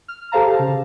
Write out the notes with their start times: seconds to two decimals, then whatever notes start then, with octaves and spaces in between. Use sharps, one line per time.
0.08 F6
0.32 G4 A4 C5 F5 A5 A#5
0.59 C#3